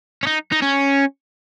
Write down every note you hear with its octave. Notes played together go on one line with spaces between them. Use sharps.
C#4
D#4
D#4
C#4